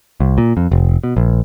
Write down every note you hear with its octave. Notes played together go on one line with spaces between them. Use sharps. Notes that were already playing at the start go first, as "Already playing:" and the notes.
C2
A#2
F2
F1
B2
A#1